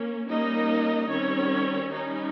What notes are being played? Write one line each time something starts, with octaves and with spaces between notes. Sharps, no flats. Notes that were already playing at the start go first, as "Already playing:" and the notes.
Already playing: A#3 C#4
G3 A#3 C#4 D#4 D#5
D#3 G3 C4 C#4 C#5
G3 C#4 D#4